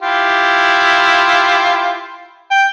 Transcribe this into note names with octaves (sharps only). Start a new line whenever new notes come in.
E4 F4 G4
G5